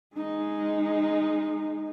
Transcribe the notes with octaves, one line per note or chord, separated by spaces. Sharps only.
G#3 D#4